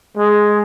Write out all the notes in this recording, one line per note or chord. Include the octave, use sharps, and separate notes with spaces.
G#3